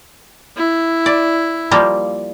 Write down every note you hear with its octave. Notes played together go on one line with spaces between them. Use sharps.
E4
D5
F3 G3 A#3